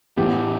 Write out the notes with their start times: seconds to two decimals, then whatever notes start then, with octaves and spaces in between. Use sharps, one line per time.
0.17 A2 E3 B3 G4